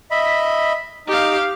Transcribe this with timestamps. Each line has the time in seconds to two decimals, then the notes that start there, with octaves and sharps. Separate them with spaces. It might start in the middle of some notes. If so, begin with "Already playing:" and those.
0.11 D#5 E5 B5
1.07 D#4 G4 F5